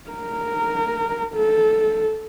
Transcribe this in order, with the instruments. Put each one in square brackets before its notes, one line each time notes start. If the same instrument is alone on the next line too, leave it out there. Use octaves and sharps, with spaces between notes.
[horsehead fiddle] A#4
A4